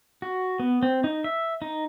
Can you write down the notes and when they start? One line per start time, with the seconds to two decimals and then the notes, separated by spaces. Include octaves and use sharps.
0.22 F#4
0.60 B3
0.83 C4
1.04 D#4
1.24 E5
1.62 D#4